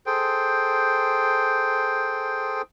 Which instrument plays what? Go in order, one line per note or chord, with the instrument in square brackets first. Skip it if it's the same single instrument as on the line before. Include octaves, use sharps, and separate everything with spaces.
[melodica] G#4 A4 C5 G5